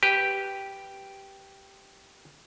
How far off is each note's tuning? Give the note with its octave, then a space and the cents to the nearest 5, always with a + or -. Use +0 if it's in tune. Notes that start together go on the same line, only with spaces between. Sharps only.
G4 -5 B4 +0